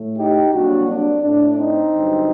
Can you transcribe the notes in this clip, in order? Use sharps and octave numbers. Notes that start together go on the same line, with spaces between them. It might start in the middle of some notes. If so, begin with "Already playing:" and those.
Already playing: A2 A3
D#4 G4
C2 C3 F#3 A#3 D4 F#4
D4
A2 A3 D4
C4 D#4
G2 D3 F#3